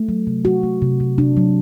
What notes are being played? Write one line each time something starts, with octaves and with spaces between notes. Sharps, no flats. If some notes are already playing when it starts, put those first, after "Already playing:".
Already playing: A3
F#3
C3
F#3 F#4
A3
C3
C3
C3 D4
F#3